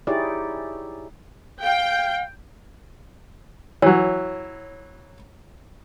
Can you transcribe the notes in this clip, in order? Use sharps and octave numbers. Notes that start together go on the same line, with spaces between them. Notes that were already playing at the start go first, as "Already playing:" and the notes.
D#4 E4 G4 G#4 C#5 D5
F5 G5
E3 F#3 C#5